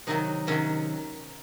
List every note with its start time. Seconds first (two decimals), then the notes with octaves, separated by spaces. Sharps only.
0.07 C3 D#3 F#3 D#4
0.47 C3 D#3 F#3 C#4